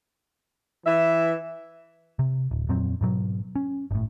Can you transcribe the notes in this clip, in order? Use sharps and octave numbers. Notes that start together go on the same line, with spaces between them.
E3 E5
C3
D1
F2 A#2 F#3 C4
G#2 B2 F#3
C#4
G1 A2